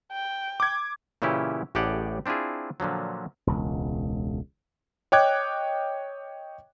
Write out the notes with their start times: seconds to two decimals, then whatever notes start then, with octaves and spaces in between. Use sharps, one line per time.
0.13 G5
0.60 D6 G#6
1.22 A#2 C#3 E3 C#4 E4 G4
1.75 A1 A2 G4 G#4 D5 F#5
2.26 C4 D4 E4 F4 G#4
2.80 A#2 D3 F3 F#3
3.47 E1 C#2
5.12 C#5 D#5 G5 D6 F#6 G#6